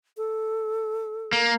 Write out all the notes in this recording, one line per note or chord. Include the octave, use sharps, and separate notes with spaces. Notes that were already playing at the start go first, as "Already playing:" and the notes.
A4
A#3